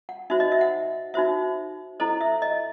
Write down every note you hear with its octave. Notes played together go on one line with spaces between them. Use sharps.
F#5
D#4 F#4 C5 E5
D#5
E5
F#5
D#4 F#4 C5 E5
E4 A4 C5 D#5
E5
D#5